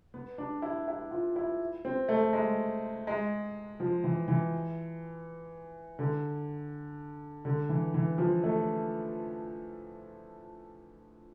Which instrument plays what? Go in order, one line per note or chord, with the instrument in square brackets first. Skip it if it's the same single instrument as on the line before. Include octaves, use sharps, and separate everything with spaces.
[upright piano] B3
D4
E4
E4
F4
E4
C4
A3
G#3
G#3
F3
E3
E3
D3
D3
E3
E3
F3
A3